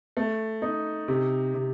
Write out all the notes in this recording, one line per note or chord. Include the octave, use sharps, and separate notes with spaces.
A3
D#4
C3
C3